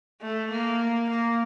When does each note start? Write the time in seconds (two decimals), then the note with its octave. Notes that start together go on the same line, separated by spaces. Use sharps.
0.21 A3
0.51 A#3
1.10 A#3